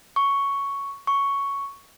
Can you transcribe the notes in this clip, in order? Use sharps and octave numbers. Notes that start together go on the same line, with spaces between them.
C#6
C#6